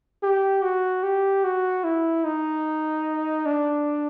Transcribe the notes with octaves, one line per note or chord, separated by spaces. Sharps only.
G4
F#4
G4
F#4
E4
D#4
D4